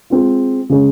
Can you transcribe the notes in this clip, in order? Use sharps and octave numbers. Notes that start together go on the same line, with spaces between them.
G#3 C4 F4
C#3 G#3 C#4